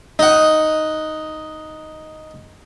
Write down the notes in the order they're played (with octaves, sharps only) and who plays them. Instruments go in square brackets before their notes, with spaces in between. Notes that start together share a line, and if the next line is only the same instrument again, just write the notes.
[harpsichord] D#4 F#5